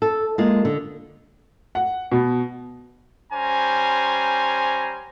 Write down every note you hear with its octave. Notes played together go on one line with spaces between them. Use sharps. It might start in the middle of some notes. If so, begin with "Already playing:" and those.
A4
G#3 A#3 F4 G#4
D3
F#5
B2
G3 C#4 C5 G#5 A#5